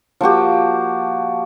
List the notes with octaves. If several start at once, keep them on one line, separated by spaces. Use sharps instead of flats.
F3 A#3 F#4 G4